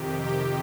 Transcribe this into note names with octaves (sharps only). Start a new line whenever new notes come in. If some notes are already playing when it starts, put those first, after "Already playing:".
Already playing: F2 C3 D#3 G4
G4